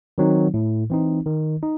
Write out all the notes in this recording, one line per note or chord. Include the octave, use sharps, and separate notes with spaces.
D#3 F#3 C4 D#4
A2
E3 C4 D#4
D#3
D#4